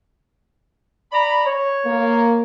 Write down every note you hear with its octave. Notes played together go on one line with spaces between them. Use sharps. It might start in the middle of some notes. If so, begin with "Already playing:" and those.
D5 A#5 B5
C#5
A#3